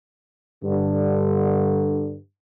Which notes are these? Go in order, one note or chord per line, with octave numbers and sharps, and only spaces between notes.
G2 D3